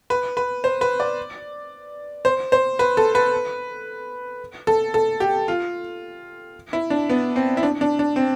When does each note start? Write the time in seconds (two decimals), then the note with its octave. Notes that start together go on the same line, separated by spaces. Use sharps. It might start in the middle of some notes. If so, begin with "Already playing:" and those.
0.10 B4
0.37 B4
0.64 C5
0.81 B4
1.00 D5
2.25 C5
2.52 C5
2.79 B4
2.97 A4
3.15 B4
4.67 A4
4.94 A4
5.20 G4
5.48 F4
6.73 E4
6.90 D4
7.10 B3
7.36 C4
7.57 E4
7.63 D4
7.81 D4
7.99 D4
8.16 C4